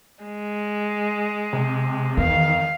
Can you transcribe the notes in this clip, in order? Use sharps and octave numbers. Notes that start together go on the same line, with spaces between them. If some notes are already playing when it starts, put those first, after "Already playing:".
G#3
C3
E2 D#3 F5